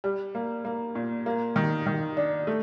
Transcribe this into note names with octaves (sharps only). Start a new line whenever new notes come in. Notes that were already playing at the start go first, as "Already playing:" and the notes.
G3
A#3
A#3
A#2
A#3
D#3
D#3
D4
A3